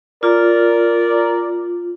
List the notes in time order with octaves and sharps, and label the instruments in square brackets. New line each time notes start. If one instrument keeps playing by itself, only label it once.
[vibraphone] F4 [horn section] A#4 D5